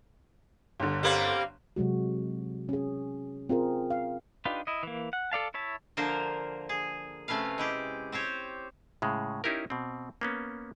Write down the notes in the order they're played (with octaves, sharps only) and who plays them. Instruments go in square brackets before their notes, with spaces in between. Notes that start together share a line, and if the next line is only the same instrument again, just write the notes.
[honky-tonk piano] G1 D3
[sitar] G3 A#3 C4
[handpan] C3 F#3 G#3 F#4
C#4 G#4
C4 F4 G#4 A#4
F5
[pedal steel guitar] D4 D#4 F4 G4 B4
E4 D#5
E3 A#3
F#5
A4 D5 F5 A5
E4 C#5 E5 A5
[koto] D3 F3 A#3 A#4 C5
G#4
C3 A3 C#4 B4 F5
G#3 E4 G4
C4 G4 C5 C#5
[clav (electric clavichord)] A2 C#3 G#3
C#4 D#4 E4 G4 A#4
B2 C4
A#3 B3 C#4